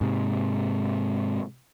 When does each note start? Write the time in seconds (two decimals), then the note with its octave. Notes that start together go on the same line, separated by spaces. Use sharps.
0.01 G#2 C3